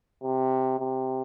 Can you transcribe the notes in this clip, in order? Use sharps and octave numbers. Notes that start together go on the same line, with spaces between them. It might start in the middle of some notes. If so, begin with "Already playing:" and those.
C3
C3